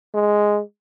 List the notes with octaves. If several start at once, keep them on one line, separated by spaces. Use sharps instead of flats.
G#3